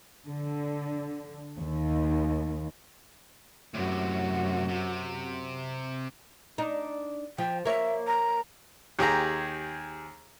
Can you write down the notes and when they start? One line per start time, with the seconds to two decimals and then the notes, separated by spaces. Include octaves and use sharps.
0.27 D3
1.57 D#2
3.74 F#2 A2 C3 F#4
4.69 C3
6.58 D4 D#4
7.38 F3 G5
7.65 A#3 C#5 E5
8.07 A#5
8.99 D#2 G4 G#4 A#5